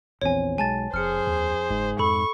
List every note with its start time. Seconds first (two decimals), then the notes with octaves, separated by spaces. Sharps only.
0.22 A#1 E2 C4 C#5 G#5
0.58 B1 G#3 G#5 A5 A6
0.94 E1 F2 G#4 C5 F6 C#7
1.27 D#2
1.70 F#1 G#2
1.99 F2 A4 B5 C#6